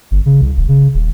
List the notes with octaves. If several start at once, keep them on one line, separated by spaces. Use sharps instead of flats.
G1
C#3
C2
D#1
C#3
D#1